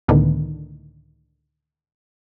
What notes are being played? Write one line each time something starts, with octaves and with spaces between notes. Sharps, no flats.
C#2 A2 D3 D#3 B3